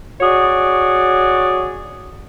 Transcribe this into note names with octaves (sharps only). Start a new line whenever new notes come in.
F#4 G#4 C#5 D5